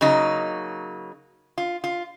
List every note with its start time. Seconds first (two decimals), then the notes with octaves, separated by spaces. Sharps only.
0.01 C#3 F#3 A#3 D#4
1.58 F4
1.84 F4